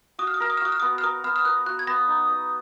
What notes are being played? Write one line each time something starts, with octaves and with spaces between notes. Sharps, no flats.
F#4 D#6
F6
D#6
A#4 F6
D#6
F6
F#4 D#6
F6
B3 D#6
F6
A#4 D#6
B3 F6
F6
A#4 F#6
F#4 F#6
G#6
B3 A#6
D#4
D#5